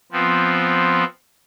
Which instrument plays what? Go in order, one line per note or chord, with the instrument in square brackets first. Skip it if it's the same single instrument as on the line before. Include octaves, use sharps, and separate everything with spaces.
[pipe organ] F3 B3 C4